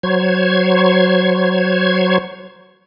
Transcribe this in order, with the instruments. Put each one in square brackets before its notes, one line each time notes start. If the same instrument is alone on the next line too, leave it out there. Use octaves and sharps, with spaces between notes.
[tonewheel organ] F#3 C5 C#5 G#6